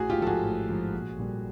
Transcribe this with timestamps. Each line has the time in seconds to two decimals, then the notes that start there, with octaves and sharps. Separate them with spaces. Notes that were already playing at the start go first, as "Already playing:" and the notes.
Already playing: A1 F#4 G#4
0.10 F4 G4
0.18 G#2 F3 A4
0.26 F#4 G#4
0.44 A1
0.69 G#2 F3
0.93 A#1
1.19 A#2 G3